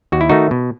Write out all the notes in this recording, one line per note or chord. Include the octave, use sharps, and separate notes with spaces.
D#2 F#4
E4
D#3 A3 D#4 F#4
B2